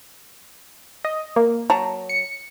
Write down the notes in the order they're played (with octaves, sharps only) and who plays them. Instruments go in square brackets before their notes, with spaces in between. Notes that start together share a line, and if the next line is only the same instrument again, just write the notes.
[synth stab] D#5
A#3
[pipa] F#3 A5 A#5
[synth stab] C#7